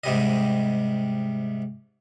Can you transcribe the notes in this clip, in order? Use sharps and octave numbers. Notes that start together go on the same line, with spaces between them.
G#2 C3 G3 D#5